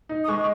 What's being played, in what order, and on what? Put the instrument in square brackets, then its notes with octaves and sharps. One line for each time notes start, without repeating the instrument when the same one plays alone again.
[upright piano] D#4
[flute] D#6
[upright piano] G#3 [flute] C#6
[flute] C#6